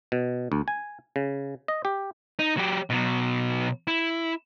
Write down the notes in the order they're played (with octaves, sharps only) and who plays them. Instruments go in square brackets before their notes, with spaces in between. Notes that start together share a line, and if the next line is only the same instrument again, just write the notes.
[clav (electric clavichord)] B2
D2
G#5
C#3
D#5
G4
[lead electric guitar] D#4
F#3 G4
B2 F#3
E4